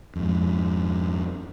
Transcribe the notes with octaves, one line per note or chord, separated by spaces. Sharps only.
F2 G#2